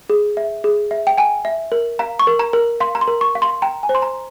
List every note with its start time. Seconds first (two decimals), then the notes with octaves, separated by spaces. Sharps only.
0.10 G#4
0.37 E5
0.64 G#4
0.91 E5
1.07 G5
1.18 G5 G#5
1.45 E5
1.72 A#4
1.99 F5 A#5
2.19 C#6
2.27 A#4
2.39 A#5
2.53 A#4
2.80 F5 C6
2.95 A#5
3.01 C6
3.08 A#4
3.21 C#6
3.35 F5
3.42 C6
3.62 G5 A#5
3.83 G#5
3.89 C5
3.95 C6
4.02 A#5